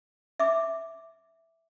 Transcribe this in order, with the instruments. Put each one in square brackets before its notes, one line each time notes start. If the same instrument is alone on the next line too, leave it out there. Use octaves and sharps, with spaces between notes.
[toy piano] E5 D6